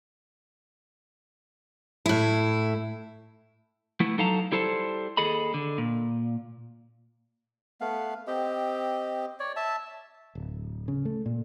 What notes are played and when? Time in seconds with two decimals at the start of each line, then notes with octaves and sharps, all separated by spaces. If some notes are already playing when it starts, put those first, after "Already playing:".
2.06 A2 E4
4.00 F3 A3 B3 E4
4.18 F#3 D#4 A4 F5 A5 A#5
4.52 G3 E4 A4 C5 A5
5.17 D#2 G#4 A4 D#5 B5
5.54 D3
5.78 A#2
7.81 A3 B3 F5
8.27 C4 G4 D#5
9.39 C#5 D5
9.56 E5 A5
10.35 D1
10.88 C#3
11.05 A3
11.26 A#2